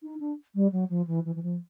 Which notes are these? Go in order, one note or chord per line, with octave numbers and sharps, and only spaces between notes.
D#4
D4
G3
F#3
F3
E3
E3
E3
F3